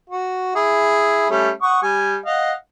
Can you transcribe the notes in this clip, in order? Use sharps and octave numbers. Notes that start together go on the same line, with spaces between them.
F#4
E4 G#4
G3 A3 C#4
F#5 C#6 D#6
G3 G#5
D#5 F5 F#5